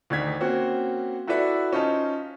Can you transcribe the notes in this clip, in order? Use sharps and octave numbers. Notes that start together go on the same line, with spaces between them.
D2 D#3 D4 G#6 B6
A#3 C4 C#4 F#4
E4 F#4 A4 B4 D5 E5
C#4 D#4 F4 C5 D#5 A5